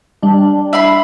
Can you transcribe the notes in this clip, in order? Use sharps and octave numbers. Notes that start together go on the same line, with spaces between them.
G3 D4
E4 B5 C6